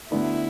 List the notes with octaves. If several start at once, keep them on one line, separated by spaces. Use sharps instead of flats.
D2 D3 B3 D4 E4